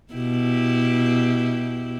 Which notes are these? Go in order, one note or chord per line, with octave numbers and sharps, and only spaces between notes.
B2 E4 G4